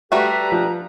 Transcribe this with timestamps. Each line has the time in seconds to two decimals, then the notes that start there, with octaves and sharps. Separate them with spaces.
0.12 G3 A3 F#4 G4 A4 B4 A#5
0.52 F3